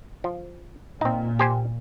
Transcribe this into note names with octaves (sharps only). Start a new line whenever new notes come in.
F3
A#2 C4 D#4
G4 C5 G#5